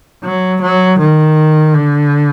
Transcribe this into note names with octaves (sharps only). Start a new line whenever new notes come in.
F#3
F#3
D#3
D3